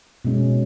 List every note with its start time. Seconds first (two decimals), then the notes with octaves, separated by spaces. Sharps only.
0.25 B2 G#3 C#4